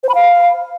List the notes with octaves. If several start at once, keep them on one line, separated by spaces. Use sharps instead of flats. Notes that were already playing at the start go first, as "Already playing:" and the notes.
C5
B5
F5